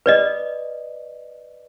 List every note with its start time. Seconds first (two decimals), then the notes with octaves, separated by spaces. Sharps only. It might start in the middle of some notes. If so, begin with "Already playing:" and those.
0.06 B4 D5 D#5